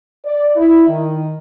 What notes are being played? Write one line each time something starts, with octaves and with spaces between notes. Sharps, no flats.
D5
E4
D#3